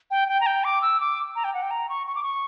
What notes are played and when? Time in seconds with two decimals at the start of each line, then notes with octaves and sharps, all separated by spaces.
0.11 G5
0.28 G5
0.41 A#5
0.46 G5
0.64 D6
0.82 E6
1.00 D6
1.36 A#5
1.44 G5
1.54 F#5
1.63 G5
1.71 A#5
1.89 C#6
2.07 C#6
2.15 D6
2.23 C#6